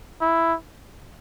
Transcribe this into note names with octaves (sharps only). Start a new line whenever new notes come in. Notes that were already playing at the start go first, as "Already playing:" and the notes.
E4